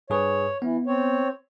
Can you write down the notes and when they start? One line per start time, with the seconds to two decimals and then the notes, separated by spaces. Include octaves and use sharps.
0.10 G2 G#4 B4 C#5
0.62 E3 B3
0.87 C4 C#5